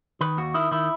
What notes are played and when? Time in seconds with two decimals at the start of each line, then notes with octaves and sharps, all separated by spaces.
0.21 D#3 B4
0.37 D#2 F#4
0.54 D#3 E4
0.71 D#3 E4